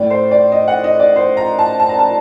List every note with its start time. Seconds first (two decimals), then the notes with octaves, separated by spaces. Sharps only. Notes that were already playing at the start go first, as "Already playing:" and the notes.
Already playing: A2 D5
0.10 C5
0.31 D5
0.52 D#5
0.68 F#5
0.84 D#5
0.99 D5
1.16 C5
1.37 A#5
1.59 A5
1.80 A5
1.89 A#5
1.99 A5